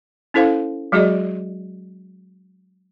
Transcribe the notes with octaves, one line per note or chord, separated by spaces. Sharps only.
C#4 E4 A4 C5 F5
F#3 G#3 F#4 G#4 D5 D#5